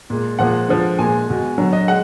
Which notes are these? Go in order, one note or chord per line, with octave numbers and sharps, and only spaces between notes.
A#2 G#3
A#2 F3 G#3 F#5
D3 F3 G#3
A#2 G#3 G#5
B2 G#3
D3 F#3
D#5
G#3 F#5